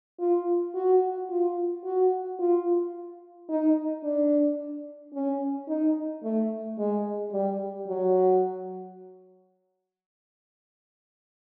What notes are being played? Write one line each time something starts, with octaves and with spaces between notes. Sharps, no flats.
F4
F#4
F4
F#4
F4
D#4
D4
C#4
D#4
A3
G#3
G3
F#3